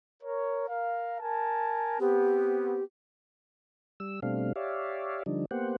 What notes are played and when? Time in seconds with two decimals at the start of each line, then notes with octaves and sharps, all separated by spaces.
0.22 A#4 C#5
0.68 A#4 F5
1.20 A#4 G#5 A5
2.00 B3 C4 G4
4.00 G3 E6
4.22 B2 G3 A3 C4 D4 F5
4.56 G4 C#5 D5 E5 F5
5.26 D3 F3 G3 D4 D#4
5.51 A#3 B3 G4 C5 F#5